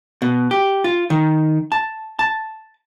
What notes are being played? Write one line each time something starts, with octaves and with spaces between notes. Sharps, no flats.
B2
G4
F4
D#3
A5
A5